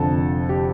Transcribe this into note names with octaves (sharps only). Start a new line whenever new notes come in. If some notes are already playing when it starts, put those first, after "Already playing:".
Already playing: F1 F2 D3 A4
G4